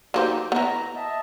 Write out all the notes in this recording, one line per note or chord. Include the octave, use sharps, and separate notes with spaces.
F#3 A#3 D#4 G4 C5
B3 E4 A#5
D#5 E5 A5